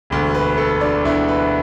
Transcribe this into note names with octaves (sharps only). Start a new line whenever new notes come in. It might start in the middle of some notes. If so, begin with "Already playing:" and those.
E1 D2 D3
B4
A4
D4
E1 D2 D3 E4
B4